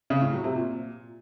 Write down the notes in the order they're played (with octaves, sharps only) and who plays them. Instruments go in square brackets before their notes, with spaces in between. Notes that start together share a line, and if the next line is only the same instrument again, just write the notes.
[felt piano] C#3
A2
F#3
C3
A#2